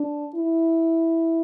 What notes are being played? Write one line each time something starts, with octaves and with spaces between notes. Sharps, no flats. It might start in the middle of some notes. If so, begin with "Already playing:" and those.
Already playing: D4
E4